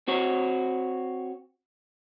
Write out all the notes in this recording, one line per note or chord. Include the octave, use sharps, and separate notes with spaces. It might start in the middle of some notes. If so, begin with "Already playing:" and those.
C4 F#4 C#5